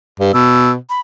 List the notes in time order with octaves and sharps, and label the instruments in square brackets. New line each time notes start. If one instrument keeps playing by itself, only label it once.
[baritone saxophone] G2
[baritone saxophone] B2 [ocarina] E6
[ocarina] B5